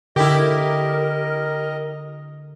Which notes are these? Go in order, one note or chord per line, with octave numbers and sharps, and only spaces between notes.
D3 E4 G4 A#4 D#5